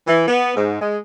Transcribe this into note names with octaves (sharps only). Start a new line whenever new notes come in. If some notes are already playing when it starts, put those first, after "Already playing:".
E3
B3
G#2
G#3